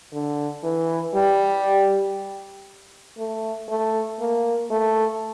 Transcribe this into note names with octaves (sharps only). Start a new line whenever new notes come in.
D3
E3
G3
A3
A3
A#3
A3